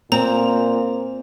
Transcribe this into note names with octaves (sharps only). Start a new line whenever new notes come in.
A#2 C4 A#5